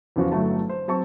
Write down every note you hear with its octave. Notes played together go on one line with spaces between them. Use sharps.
E2 C#3 F3 F#4
G1 F#3 A3 E4 A5
C5
F#3 C4 A5 C#6